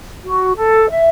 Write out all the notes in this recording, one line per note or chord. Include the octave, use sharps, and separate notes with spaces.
F#4
A4
E5